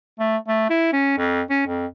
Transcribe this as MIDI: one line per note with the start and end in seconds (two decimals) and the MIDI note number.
0.20 0.37 57
0.48 0.69 57
0.70 0.92 64
0.93 1.14 61
1.18 1.42 41
1.50 1.63 61
1.67 1.86 41